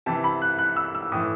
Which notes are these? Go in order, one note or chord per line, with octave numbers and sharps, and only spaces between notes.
C3 E3 A5
B5
F#6
F#6
E6
E6
A2 E3 D#6